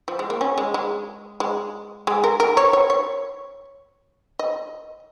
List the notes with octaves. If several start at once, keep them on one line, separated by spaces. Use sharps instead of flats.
F3
G#3
A#3
C#4
G#3
G#3
G#3
G#3
A#4
A#4
C#5
C#5
C#5
D#5